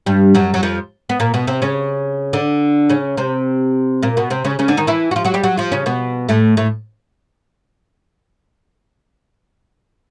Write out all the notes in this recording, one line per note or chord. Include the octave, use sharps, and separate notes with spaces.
G2 G3
F#2 F#3
F#3
F2 F3
B3
A#2 A#3
B2 B3
C3 C4
C#3 C#4
D3 D4
C#3 C#4
C3 C4
A#2 A#3
B2 B3
C3 C4
C#3 C#4
C#3 C#4
D3 D4
D#3 D#4
E3 E4
F#4
F3 F4
F#3 F#4
G3 G4
F#3 F#4
F3 F4
C#3 C#4
B2 B3
A2 A3
A2 A3